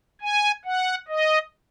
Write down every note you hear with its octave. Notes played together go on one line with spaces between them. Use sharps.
G#5
F#5
D#5